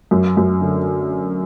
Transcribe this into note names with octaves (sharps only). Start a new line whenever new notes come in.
F#2
F#2
D3